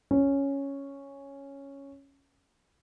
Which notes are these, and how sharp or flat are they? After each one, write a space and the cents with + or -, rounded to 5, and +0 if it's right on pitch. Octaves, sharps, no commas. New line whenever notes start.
C#4 +0